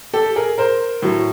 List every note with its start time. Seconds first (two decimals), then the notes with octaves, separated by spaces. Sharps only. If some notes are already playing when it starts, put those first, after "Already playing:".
0.13 G4 A4
0.36 G#4 A#4
0.58 A#4 C5
1.02 A2 F#3